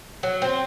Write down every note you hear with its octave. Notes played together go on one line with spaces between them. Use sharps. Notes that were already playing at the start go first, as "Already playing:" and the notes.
F#3
C4